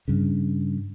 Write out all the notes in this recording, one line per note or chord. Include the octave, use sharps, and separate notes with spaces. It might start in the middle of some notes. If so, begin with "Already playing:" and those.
G2 C#3